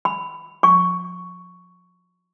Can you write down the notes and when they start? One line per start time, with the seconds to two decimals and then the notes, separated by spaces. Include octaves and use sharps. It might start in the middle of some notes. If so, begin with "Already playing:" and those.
0.05 B5
0.63 C#6